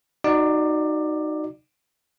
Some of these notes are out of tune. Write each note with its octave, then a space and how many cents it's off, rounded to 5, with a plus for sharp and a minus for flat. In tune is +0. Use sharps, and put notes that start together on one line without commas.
D#4 -10 F#4 +0 D5 +15